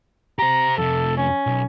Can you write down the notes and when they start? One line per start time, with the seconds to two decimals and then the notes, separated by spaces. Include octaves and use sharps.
0.39 G4 C5 A#5
0.78 F2 C3 A4
1.17 C#4
1.47 B1